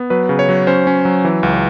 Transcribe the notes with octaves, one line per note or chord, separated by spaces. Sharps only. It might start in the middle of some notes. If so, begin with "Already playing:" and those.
Already playing: B3
F#3 B4
C#3
C#5
F#3
C#4 C5
C#4
F#3
E3
C#2